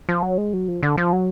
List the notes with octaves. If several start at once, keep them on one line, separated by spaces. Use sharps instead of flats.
F3
F#3
G#3
F#3
F3
D3
F3
F#3